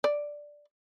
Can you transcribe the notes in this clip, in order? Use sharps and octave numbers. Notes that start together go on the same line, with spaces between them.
D5